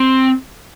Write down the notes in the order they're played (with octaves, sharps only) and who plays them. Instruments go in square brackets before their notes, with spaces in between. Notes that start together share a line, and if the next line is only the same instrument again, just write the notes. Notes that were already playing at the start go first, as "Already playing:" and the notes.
Already playing: [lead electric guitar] C4